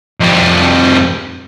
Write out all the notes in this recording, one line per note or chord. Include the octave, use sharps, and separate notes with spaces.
F2 G3